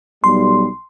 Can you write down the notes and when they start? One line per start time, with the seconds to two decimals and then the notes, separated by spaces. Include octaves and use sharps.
0.24 B1 G3 C6